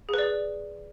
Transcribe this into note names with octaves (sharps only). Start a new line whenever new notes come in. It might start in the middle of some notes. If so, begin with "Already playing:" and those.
G#4 B4 D5